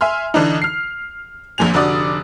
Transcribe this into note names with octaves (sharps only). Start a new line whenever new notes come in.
E5 G#5 C6 F6
D3 E3 D4 D#4
F6 C7
A#1 F2 A#2 G#5 F7
F1 D3 F#4 D5 D#6